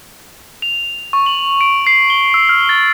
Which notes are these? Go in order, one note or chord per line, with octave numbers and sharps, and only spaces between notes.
F7
C#6
F#7
D7
C7
G7
E6
F6
A6